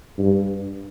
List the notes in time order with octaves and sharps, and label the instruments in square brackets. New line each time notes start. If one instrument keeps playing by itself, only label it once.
[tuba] G2